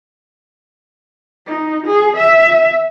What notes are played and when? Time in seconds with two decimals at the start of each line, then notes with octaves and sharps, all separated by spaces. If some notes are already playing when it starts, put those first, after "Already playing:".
1.47 D#4
1.86 G#4
2.16 E5